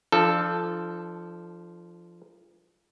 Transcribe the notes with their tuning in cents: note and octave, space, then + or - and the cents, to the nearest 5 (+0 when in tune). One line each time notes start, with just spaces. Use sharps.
F3 -15 D4 +30 A4 -5